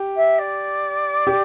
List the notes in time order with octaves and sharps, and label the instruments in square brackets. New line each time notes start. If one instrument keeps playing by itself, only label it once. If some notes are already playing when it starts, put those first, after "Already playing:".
Already playing: [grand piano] G4
[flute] E5
D5
[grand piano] G4